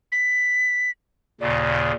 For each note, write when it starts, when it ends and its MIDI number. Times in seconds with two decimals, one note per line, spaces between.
0.12 0.90 95
1.41 1.92 39
1.41 1.92 46
1.41 1.92 49
1.41 1.96 74